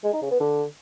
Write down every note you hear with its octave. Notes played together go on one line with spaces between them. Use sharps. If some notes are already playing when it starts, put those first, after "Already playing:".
G#3
D#4
C#3
B3
D3